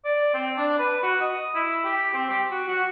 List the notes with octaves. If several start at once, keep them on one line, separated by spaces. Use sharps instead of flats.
D5
C4
D4
B4
F#4
D#5
E4
G4
C4
G4
F#4
F#4